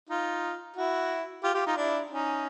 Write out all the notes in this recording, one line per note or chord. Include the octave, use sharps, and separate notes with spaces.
D#4 F4
E4 F#4
F4 G4
F4 G4
D#4 F4
D4 E4
C#4 D#4